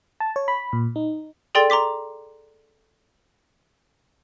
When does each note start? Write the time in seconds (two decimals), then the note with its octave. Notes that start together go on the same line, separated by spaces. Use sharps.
0.20 A5
0.36 C#5
0.48 B5
0.73 A#2
0.96 D#4
1.55 G#4 A4 D5 G5 C6 A6
1.70 A#5 C6 D6 B6